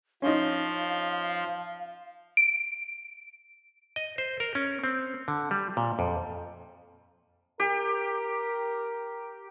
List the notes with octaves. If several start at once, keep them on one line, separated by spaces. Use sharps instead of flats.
F3 C#4 D#4 F5 C6
D7
D#5
C5
A#4
C#4
C4
D3
G3
A#2
F2
G4 A#4